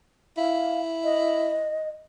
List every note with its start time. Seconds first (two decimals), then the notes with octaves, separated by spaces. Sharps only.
0.37 E4 F5
1.04 D#5